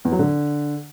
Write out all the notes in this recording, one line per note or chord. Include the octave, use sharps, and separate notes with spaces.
E2
F#3
D3